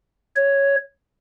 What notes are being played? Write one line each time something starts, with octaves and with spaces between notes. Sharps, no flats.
C#5